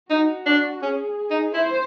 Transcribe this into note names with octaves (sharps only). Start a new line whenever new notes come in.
D#4 F#4
D4
C#4 G#4
D#4
E4 C5